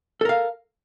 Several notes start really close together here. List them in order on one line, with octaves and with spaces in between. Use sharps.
A4 A#4 F5